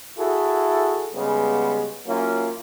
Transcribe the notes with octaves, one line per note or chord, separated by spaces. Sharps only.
E4 F#4 G#4 A4
C#3 G3 G#3 B3
F#3 A#3 C#4 E4 F4